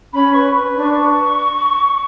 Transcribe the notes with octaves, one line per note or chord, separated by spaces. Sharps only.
C#4 B5
B4 C#6
B4
D4
C#6
B4